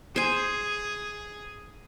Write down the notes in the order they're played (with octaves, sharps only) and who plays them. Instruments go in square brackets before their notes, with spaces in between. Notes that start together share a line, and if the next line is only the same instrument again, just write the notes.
[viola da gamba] G#4 [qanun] C5 G#5